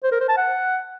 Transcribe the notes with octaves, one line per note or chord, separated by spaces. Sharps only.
C5
A#4
C5
A5
F#5